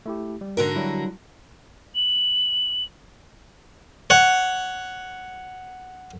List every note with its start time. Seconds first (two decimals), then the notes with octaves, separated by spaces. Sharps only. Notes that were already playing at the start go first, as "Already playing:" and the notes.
0.06 A3 E4 G4
0.41 G3
0.57 G#2 D3 F#4 A#4
0.76 F#3 G3 E4
1.95 F#7
4.10 C#5 F#5